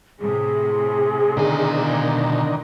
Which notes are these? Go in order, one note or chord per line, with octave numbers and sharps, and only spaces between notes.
A2 C3 G#4
B2 D3 D#3 A#4 G#5